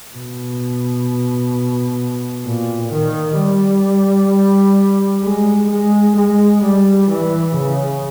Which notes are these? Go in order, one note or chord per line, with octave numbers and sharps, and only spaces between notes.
B2
A#2
D#3
G3
G#3
G#3
G#3
G3
E3
C#3